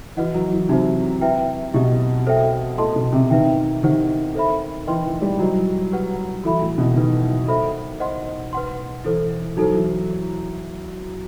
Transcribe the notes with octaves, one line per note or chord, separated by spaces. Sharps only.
E3 F#4 B4 D#5 F#5
F#3
E3
C3 D#4 F#4 C5
E4 B4 E5 G5
B2 E4 G4 D#5
A4 C5 E5 G5
A2 A4 D#5 A5 C6
B2
C3
D#3 B4 E5 G5
D#3 E4 G4 C5 F#5
A4 C5 E5 B5
E3 B4 D#5 G5 C6
E3
G3
F#3 F#4 C5 D#5
G4 B4 F#5
E3 F#4 A4 E5 B5
A2
B2
D#3 E4 G4 B4
A4 C5 E5 B5
C5 D#5 F#5 C6
B4 F#5 C6
E3 E4 A4 C5
F#3 D#4 A4 C5
E3